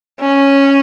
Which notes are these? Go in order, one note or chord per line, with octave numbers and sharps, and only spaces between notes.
C#4